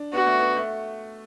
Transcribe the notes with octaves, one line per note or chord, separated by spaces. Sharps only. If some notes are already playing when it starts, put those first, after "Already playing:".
Already playing: D4
B3 F#4
A3
B3
A3